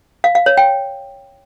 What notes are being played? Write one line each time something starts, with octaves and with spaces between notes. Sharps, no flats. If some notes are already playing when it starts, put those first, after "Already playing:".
F5
F5
C#5
G5